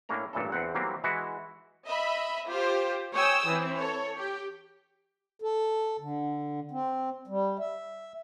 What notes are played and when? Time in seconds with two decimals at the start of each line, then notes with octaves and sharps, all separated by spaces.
0.09 A2 A#3 C#4 D4 A#5
0.33 A1 G2 A#2 E3 A4
0.52 E2 C4 F#5
0.75 E3 F#3 G3 A#3 C4
1.04 E3 G#3 E4 F#4
1.85 D#5 E5 B5
2.48 F4 G4 C5
3.13 C#5 G5 G#5 D#6 E6
3.47 E3 C4
3.77 A4 C#5
4.17 G4
5.42 A4
6.00 D3
6.71 C4
7.28 G3
7.59 E5